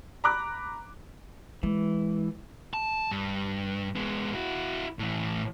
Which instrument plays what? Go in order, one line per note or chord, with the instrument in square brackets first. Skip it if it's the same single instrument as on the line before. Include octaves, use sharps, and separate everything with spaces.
[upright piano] A#5 B5 D6 F#6
[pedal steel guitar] E3 [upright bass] G#3
[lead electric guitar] A5
G2
G#3 B3
E4 F#4
A2 E3